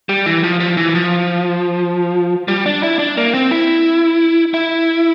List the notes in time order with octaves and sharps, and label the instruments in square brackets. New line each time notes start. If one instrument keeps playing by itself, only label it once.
[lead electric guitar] G3
E3
F3
F3
E3
F3
G3
D4
E4
D4
A#3
C4
E4
E4